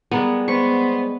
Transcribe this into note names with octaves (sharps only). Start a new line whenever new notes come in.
G3 G#3 B3 A#4
B3 C5 C#6